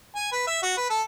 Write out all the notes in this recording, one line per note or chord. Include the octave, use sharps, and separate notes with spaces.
G#5
B4
E5
F#4
B4
A4